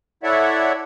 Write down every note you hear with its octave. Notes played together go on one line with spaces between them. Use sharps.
E4 A4 C#5 D5 E5 F#5